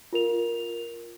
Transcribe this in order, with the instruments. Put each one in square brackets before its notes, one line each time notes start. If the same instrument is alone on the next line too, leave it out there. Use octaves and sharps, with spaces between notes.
[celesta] F4 A#4 F7